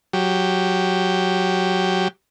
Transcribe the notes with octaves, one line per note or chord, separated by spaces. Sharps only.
F#3 G4